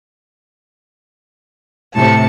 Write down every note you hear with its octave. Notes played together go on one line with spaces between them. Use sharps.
A2 C3 A5 C#7